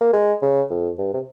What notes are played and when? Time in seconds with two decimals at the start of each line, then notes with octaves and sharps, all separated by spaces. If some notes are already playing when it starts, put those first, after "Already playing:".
0.01 A#3
0.13 G#3
0.42 C#3
0.70 F2
0.98 G2
1.14 C3